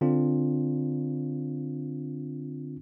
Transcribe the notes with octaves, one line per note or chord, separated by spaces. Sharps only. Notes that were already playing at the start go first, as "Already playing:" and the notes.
D3 C4 D4 F4